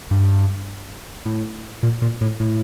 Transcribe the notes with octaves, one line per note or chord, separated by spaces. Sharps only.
G2
A2
A#2
A#2
A2
A2